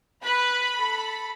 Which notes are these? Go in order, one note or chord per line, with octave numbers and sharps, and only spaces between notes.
B4 B5
A4